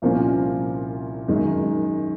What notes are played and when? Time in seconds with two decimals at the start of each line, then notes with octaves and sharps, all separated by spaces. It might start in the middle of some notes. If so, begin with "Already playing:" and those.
0.02 C2 A#2 F3 A#3 C#4
1.28 F#2 D#3 G#3